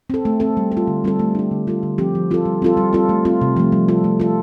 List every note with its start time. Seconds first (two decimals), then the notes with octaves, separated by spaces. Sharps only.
0.10 C4 A4
0.25 A3
0.40 C4 A4
0.57 G3
0.72 A4
0.77 F4
0.87 D3
1.04 G3 C4 A4
1.19 A3
1.35 D4 G4
1.51 D3
1.67 G3 F4 A4
1.83 D3
1.98 F3 C4 G4
2.15 F3
2.31 C4 F4 A4
2.45 G3
2.62 C4 F4 A4
2.77 G3
2.93 C4 F4 A4
3.09 A3
3.25 C4 F4
3.41 C3
3.56 F3 A3
3.72 G3
3.88 F4 A4
4.04 A3
4.20 F4 A4